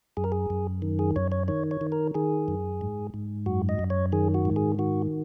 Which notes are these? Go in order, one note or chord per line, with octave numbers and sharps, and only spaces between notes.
F#2 G#4
A#4
G#4
F#2
D#3
G#4
F#2 C#5
C#5
D#3 C#5
C#5
D#3
A#4
D#3 G#4
F#2
G#2
G#2
F#2 F#4
D#5
F#2
C#5
D#3 G#4
F#4
G#2
G#4
D#3 F#4